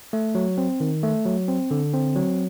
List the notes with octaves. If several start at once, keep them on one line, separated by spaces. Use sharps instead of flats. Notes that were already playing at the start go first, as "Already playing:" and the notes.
A3
F#3
C4
D#3
A3
F#3
C4
D3
C4
F#3